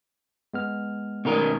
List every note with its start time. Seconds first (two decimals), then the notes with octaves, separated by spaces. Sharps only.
0.54 G#3 B3 F6
1.25 B2 D#3 A#4